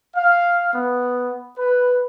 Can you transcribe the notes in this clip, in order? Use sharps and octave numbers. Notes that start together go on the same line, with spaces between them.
F5
B3
B4